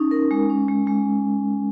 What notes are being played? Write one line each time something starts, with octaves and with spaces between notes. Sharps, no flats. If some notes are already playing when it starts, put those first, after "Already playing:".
Already playing: C#4 D#4
A#4
G#3
C#4
G#3
G#3